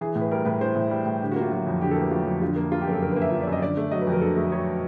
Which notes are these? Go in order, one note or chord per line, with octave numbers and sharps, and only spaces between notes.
E3 G#4
A2
B4
G3 A#4
A2 B4
E3 C5
A2
G3
A2
D3 G4
F#4
A#3
F4
F#3 F#4
F2
D3 G4
A4
A#3 B4
F#3 F4
F2
D3 F4
A#3
F3 F4
G4
F#2 A#4
A4
D3 A#4
B4
A#3
E5
F3
D5
F#2
D#5
D3 D5
A3
F#3 D#5
B4
F2 A#4
D3 A4
A3
F#3 C#5